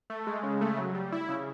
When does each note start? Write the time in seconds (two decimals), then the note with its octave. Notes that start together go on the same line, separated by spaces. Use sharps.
0.10 A3
0.27 G#3
0.43 C#3
0.61 A3
0.78 F#3
0.95 G3
1.13 E4
1.29 C#3